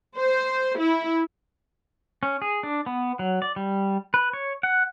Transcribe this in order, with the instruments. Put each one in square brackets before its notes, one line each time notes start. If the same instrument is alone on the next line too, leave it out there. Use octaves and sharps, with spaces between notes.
[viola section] C5
E4
[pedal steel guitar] C#4
G#4
D4
B3
F#3
D5
G3
B4
C#5
F#5